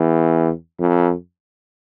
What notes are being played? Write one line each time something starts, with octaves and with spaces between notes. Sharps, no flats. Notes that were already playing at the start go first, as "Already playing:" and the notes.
Already playing: E2
F2